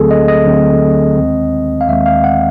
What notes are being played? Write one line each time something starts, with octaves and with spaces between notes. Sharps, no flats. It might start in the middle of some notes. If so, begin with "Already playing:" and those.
Already playing: D2 D3 F#3 A3 C4 G#4 A4
D#5
D#5
D2 D3 F#3 A3 C4
D#2 D#3 G#3 C4
F5
D#2 D#3 G#3 C4 E5
F5
F#5